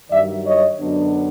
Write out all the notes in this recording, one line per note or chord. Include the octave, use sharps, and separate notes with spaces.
G2 D#3 F#3 D5 E5
C#5 D#5
F#2 D3 F#3 B3 D4